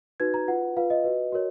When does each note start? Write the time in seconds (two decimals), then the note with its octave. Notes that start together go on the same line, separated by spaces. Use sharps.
0.20 D#4 F#4 B4 G#6
0.34 A#5
0.48 F4 B4 F#5
0.77 F4 B4 F5
0.90 D#5
1.04 F#4 B4
1.32 F#4 A#4 C#5